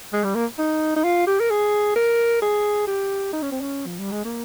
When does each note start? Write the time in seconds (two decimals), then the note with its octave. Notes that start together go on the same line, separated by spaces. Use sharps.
0.13 G#3
0.24 G3
0.35 A#3
0.59 D#4
0.96 D#4
1.04 F4
1.27 G4
1.40 A#4
1.50 G#4
1.96 A#4
2.42 G#4
2.87 G4
3.33 D#4
3.42 C#4
3.52 C4
3.61 C#4
3.86 F3
3.99 G3
4.11 G#3
4.25 A#3